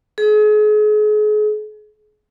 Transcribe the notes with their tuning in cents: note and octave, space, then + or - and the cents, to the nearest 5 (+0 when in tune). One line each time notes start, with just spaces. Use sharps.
G#4 +35